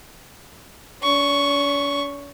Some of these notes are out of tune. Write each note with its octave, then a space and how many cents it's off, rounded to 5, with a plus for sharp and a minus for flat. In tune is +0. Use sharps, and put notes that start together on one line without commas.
C#4 +45 C#6 +0